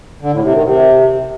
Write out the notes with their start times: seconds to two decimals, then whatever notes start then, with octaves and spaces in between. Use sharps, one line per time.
0.21 D3
0.32 A2
0.43 C3
0.53 D#3
0.64 C3